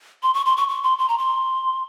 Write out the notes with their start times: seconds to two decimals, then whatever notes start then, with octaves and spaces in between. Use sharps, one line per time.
0.23 C6
0.34 C#6
0.46 C6
0.57 C#6
0.69 C#6
0.84 C6
0.99 C6
1.09 A#5
1.18 C6